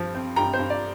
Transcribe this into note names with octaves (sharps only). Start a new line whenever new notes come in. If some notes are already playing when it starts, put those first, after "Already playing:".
Already playing: G2 F3
C4
G2 G5 A#5
C5
G2
D5